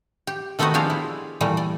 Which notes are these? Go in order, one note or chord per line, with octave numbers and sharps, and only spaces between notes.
G4
D#3 A3 B3 C4 F#4 D#5
F3 D4 F4 G4 G#4 F5
E4
A#2 E3 G3 A3
D5